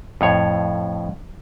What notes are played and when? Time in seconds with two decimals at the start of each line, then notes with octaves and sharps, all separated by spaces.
0.21 F2 A2 C#5